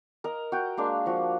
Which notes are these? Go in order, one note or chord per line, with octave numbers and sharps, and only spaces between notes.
A#4 D#5
F#4 G5
G#3 A#3 D4
F3 F#4